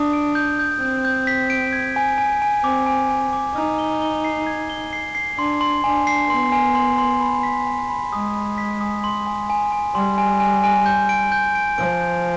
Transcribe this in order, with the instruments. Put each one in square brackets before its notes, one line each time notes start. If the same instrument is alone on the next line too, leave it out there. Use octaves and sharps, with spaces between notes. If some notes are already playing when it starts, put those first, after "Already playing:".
Already playing: [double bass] D4 [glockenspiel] D#6
[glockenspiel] D7
G6
G6
[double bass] C4 [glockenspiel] G6
[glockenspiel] G6
B6
D7
G#6
G#5
G#5
G#5
[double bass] C4 [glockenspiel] D6
[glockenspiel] G#5
G#5
D6
[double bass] D#4 [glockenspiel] F6
[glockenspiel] G7
G7
C7
G#6
G7
C7
C7
[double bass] D4 [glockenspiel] C6
[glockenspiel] C6
[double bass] D4 [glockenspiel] G#5
[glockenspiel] C7
[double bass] B3 [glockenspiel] C6
[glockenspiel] G#5
C6
C6
B5
B6
G#5
B5
[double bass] G#3 [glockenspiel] D#6
[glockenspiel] B5
B6
D#6
C6
G#5
G#5
G#5
[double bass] G3 [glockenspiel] C6
[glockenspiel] G#5
G#5
G#5
G6
D7
G6
D7
[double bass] F3 [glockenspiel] D7
[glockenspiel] G6